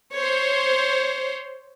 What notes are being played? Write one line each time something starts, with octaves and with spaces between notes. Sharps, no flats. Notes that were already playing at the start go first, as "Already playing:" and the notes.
C5 C#5